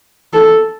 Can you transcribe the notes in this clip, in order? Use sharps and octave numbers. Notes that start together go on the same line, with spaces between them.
A4